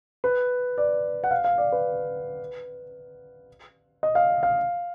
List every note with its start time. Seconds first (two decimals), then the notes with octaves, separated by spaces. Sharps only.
0.24 B4
0.78 D5
1.24 F#5
1.31 F5
1.44 F5
1.58 D5
1.72 B4
4.03 D#5
4.15 F5
4.43 F5